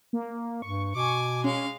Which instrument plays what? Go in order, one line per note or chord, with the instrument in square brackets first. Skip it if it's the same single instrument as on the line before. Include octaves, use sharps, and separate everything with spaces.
[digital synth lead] A#3
[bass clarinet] G2 [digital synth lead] C#6
[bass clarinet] B2 [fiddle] G#5 D6
[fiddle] G#3 F5 [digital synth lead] C#4